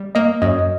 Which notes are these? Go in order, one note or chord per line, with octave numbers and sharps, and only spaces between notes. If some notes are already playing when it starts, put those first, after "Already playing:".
Already playing: G3
A#3 D#5
F#2 D#5